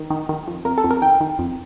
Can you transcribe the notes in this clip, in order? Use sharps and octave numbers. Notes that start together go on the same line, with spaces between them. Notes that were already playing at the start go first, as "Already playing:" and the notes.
Already playing: D#3
D#3
D#3
F2
F2 A#4
A4
F2
A#4
D#3 G5
D#3
F2